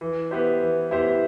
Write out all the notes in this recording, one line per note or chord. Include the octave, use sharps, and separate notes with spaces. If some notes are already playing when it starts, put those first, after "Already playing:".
E3
B3 E4 G4 C5
E3
B3 E4 G4 C5